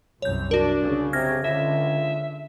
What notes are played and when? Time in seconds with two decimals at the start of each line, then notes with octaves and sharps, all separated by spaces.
0.22 C2 F#2 C#5 G6
0.51 D4 F#4 A#4
0.81 C#3
1.13 C3 F6 G#6 A#6
1.45 C#2 D3 E5